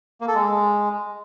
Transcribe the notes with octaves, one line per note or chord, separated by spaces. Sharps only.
A#3
A4
G#3